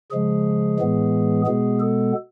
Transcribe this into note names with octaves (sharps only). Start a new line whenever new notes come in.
C#3 F3 G#3 G#4
A2 E3 G#3 B3
B2 G#3 B3 G#4
A4